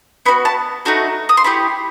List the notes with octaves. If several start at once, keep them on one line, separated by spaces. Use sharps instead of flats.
B3 D#4 F#4 B5
A5
A3 D#4 F#4 A4
D#6
C6
A3 E4 G4 B5